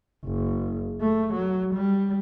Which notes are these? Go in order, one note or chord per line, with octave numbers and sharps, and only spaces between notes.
F#1
A3
F#3
G3